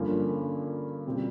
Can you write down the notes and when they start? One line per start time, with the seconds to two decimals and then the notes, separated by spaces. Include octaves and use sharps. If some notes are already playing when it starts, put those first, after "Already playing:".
Already playing: G2 D3 F3 A#3 C#4
1.07 B2 G3 C4 F4